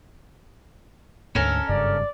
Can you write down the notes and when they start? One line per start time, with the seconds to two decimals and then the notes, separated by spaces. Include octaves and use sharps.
1.35 D2 G#2 C#4 A4 A#4
1.69 F#1 G2 C#3 D5